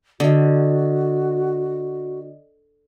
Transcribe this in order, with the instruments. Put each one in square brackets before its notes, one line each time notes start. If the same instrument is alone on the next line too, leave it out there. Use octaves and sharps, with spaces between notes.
[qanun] D3 [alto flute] F#4 [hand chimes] D5 D#5